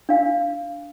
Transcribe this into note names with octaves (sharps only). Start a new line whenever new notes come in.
D4 F5